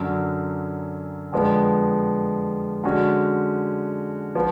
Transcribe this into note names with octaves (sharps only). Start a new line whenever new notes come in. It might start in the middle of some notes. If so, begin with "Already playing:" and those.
Already playing: F#2 D3 F#3 C#4
F2 D3 F3 G#3 B3
D3 G#3 C#4 F#4
F3 B3